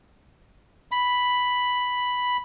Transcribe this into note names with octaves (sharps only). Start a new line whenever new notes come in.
B5